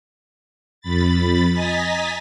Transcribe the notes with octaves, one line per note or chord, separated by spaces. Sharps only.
F2 B5 A6
D#5 G#5 A#5 A6 B6